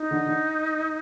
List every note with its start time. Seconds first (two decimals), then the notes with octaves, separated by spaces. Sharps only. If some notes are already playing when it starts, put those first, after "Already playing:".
Already playing: D#4
0.11 D3
0.26 D3